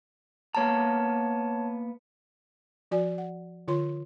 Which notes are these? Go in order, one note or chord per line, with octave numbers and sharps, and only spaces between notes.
A#3 B3 C#5 A5 A#5
F3 F#4 D5 G#5
F#5
D3 F4 C#5 C6